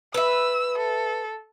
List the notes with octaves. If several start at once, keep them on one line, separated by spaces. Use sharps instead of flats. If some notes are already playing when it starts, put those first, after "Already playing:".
B4 E5 E6
A4